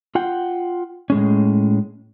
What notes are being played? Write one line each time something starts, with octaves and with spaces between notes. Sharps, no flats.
F4 F#5 G5
A2 G#3 C#4